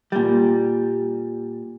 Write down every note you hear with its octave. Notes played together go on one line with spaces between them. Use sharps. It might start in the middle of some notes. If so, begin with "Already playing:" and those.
A#2 G3